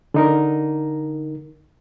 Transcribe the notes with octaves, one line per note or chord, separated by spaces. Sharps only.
D3 D#4 A#4